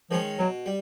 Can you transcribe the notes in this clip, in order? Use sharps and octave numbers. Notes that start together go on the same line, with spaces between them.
D#3 F3 G#3 C#4
B2 F#3
G3